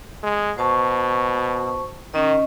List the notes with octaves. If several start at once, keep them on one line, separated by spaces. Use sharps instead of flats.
G#3
B2 C5 A5 C#6
D#3 C#4 D#5